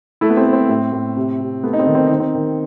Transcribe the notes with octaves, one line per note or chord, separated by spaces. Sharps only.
A3 E4
B3
C4
A3
C4
A2
A2
C3
C3
A3 B3
D#4
C4
D#3
C4
D#3 D#4
C4
D#3